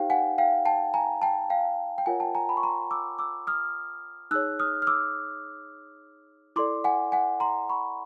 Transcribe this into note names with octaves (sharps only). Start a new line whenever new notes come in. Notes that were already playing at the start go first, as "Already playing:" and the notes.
Already playing: D#4 G4 C5 F5 G5
F#5 G#5
F5 G5
G5 A5
G#5 A#5
G5 A5
F5 G5
G5
F4 A#4 C#5 F#5 G#5
G5 A5
G#5 A#5
A5 B5
C#6
A#5 C6
D6 E6
D6 E6
D#6 F6
D#4 G#4 C#5 E6 F#6
D#6 F6
F6
D6 E6
E4 A4 D5 C6 D6
F#5 G#5
F#5 G#5
A#5 C6
B5 C#6